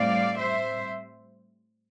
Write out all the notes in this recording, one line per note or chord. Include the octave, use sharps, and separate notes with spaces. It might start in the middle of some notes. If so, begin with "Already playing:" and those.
Already playing: A2 G3 C4 D5 F5
C5 E5